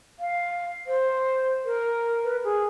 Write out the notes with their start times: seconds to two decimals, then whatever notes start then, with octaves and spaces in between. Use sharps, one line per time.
0.19 F5
0.87 C5
1.65 A#4
2.24 B4
2.44 G#4